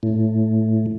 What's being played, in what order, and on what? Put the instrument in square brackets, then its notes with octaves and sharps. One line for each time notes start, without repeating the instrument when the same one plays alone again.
[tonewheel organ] A2